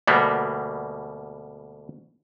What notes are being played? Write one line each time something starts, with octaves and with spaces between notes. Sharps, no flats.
D2 B2 G3 A#3 B3